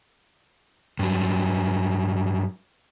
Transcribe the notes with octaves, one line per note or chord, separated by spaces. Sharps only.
G2 F#3